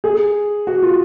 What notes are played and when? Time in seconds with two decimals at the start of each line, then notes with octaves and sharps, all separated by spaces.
0.04 G#4
0.67 F#4
0.82 F4